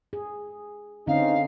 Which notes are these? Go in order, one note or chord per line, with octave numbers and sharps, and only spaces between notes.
G#4
D3 C4 C#4 D#4 F5